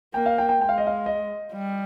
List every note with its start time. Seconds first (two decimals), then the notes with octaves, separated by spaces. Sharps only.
0.14 A#3 G5
0.26 F5
0.38 G5
0.49 G5
0.61 G#3 G5
0.69 F5
0.78 D#5
0.87 F5
1.06 D#5
1.53 G3